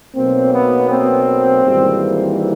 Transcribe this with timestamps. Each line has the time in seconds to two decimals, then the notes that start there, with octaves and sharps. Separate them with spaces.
0.15 B1 B2 F#3 A#3 C4
0.52 B3
0.89 C4
1.64 G#1 G#2 E3 G3 A#3